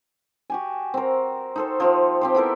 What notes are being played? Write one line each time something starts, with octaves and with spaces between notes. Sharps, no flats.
F#4 G4 G#5
C4 A#4
D#4 A4 C5
F3 D#4 G4
C4 G4 C5
B3 E4 A4 A#4